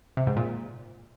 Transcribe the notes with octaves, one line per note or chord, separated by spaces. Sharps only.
C3
G#2
A#2